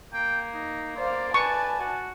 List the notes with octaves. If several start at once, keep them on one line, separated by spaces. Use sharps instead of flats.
A#3 G5
D#4
C5 D5 F5
B4 G#5 A5 C#6
F#4